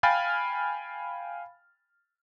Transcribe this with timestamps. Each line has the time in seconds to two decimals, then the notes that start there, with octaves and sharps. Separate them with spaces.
0.03 F5 G5 G#5 B5 F6 A6